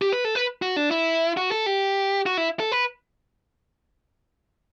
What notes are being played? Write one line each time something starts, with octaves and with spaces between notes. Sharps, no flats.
G4
B4
A4
B4
F#4
D4
E4
F#4
A4
G4
F#4
E4
A4
B4